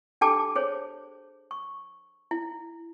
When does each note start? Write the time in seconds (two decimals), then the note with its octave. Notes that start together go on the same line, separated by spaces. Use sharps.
0.21 D4 G4 A4 G5 A5 D6
0.56 G#4 C5 C#5
1.51 C#6
2.31 E4